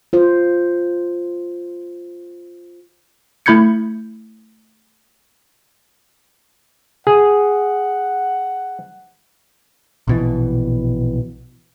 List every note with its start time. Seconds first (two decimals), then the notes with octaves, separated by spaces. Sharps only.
0.13 F4 C5
3.46 A3 E4 B5 G6 G#6 C#7
7.07 G#4 F#5
10.07 A#1 B2 E3